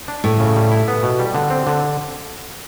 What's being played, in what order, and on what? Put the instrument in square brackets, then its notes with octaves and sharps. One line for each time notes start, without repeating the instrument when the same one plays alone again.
[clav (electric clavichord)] D4
[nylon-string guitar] A2 [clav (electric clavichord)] A3
[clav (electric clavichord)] C#3
G3
E4
B3
B2
G3
D3
C4
D3